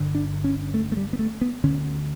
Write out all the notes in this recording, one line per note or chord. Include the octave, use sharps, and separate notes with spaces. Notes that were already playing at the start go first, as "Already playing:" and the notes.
Already playing: G1 G2 D3
D4
C#4
A3
A3
G3
B3
A3
B3
D2 D3 C#4